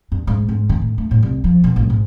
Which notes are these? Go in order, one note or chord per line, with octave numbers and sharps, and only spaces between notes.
G2
G#2
G#2
D#3
A2
A3
A2
C2
F3
B2
A1
G#2